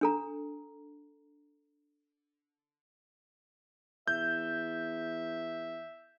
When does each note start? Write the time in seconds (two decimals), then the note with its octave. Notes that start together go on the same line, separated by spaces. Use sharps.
0.01 D4 A4 A#5
4.08 E2 E5 G6